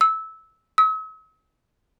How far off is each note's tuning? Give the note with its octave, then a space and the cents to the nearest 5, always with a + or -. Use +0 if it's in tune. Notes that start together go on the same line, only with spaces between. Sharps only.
E6 -15
E6 -45